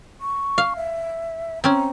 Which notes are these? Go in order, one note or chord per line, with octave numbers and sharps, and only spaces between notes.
C#6
F5
E5
C4 C#4 A#5